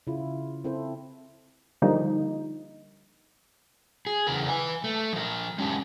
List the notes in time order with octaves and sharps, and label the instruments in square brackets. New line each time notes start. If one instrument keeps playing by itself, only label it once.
[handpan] C#3 E4 F4
C4 E4 A4 C5
[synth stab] D3 F3 G3 A#3 D#4
[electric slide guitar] G#4
E2 C#3 A#4
B4 G#5
A3
F3 A#4
G#3 C#4 G4